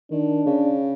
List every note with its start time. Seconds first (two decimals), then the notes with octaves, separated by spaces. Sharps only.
0.11 D#3 D4
0.46 C#3